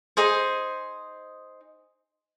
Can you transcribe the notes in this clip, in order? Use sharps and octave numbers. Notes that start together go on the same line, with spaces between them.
D#4 G#4 C5